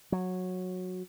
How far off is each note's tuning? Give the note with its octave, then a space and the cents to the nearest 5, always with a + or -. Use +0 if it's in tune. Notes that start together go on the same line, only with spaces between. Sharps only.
F#3 -15